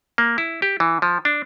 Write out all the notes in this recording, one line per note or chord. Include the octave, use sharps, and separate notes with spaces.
A#3
E4
G4
E3
F3
D4